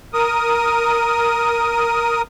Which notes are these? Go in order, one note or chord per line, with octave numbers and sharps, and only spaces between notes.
A#4 D#6